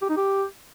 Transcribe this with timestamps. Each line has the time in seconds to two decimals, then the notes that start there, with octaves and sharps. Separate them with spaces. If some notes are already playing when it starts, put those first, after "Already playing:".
0.02 G4
0.09 D#4
0.17 G4